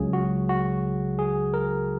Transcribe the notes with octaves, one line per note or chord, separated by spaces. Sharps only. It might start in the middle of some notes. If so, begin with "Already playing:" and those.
Already playing: C#2 C#3 F#3 G#4
F#4
F#4
G#4
A#4